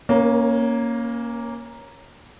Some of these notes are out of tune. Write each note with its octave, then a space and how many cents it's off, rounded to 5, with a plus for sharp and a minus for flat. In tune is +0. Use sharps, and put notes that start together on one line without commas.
A#3 +0 C#4 -5 A#4 +40